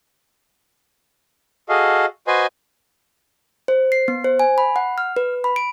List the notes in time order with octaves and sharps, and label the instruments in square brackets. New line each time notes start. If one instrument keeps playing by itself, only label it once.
[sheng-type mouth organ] F#4 G#4 A4 D#5 F5
F#4 B4 C5 D#5 G#5 C6
[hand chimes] C5
C7
B3
C5
G#5
B5
F#5
F6
B4
B5
D7